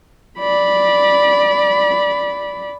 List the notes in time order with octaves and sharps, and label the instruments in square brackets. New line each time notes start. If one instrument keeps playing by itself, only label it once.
[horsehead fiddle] D5 B5